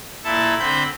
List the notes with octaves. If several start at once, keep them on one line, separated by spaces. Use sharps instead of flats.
A#2 E4 A4 A5
D3 C4 B5 G6